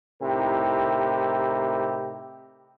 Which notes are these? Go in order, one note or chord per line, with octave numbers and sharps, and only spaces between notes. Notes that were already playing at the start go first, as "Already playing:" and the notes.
A2 C3 D#4 E4 G4 A#4